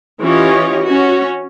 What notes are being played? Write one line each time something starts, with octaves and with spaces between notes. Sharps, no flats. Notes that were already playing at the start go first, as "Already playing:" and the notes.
E3 C#4 F4 G4 C#5 D#5
C#4 F#4